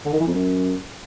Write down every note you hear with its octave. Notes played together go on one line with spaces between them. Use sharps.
D3
D#3
E3
F2
F#2